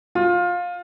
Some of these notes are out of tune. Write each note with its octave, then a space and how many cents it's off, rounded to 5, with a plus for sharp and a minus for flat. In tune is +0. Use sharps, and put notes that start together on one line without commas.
F4 +20